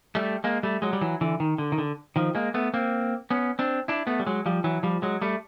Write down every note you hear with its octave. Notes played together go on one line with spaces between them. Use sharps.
G3 A3
G#3 A#3
G3 A3
F#3 G#3
G3
E3 F#3
D3 E3
D#3
D3
D#3
D3
D#3 F3
G#3 A#3
A3 B3
A#3 C4
B3 C#4
C4 D4
D4 E4
A3 B3
G3
F#3 G#3
F3 G3
E3 F#3
F3 G3
F#3 G#3
G3 A3